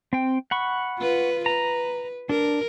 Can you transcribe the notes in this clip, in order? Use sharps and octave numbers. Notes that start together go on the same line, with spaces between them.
C4 G5
F#5 B5 C#6
F4 B4
B4 A#5
D4 A#4